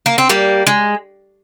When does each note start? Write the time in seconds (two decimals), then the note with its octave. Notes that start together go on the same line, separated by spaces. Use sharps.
0.06 A#3
0.18 C4
0.29 G3 A#3
0.67 G#3